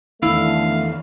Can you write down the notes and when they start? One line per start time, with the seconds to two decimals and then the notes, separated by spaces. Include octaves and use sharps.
0.22 E2 D3 D#3 A3 E4 F5